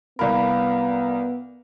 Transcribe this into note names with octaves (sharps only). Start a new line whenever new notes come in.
C2 B3 A#4 D5 F5 B5